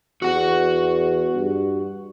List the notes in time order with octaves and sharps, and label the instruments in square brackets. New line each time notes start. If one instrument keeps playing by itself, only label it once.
[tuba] E2 [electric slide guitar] F#4 F#5
[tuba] G2